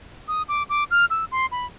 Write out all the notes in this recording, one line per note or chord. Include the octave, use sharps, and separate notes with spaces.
D#6
D6
D6
F6
E6
C6
B5